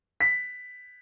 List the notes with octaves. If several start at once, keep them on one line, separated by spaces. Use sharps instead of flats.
B6